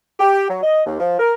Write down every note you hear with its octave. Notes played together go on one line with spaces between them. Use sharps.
G4
F#3
D#5
D#2
F3
A#4